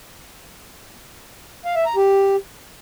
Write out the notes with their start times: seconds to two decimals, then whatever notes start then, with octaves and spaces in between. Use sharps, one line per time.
1.65 F5
1.75 E5
1.86 A#5
1.96 G4